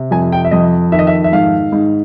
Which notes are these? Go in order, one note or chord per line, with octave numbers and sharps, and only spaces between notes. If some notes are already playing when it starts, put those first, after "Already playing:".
Already playing: C3
F2 G#5
G5
E5
F2 D#5
D#3 E5
D#5
E5
E5
G#2 F5
G#2